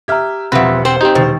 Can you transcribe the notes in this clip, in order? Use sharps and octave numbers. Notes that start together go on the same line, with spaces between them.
G4 E5 A#5 F6 G#6
E1 F3 C4 G4 B4 E5 F#5
C4 C5
C4 D#4 G4 G6
E1 D#3 C5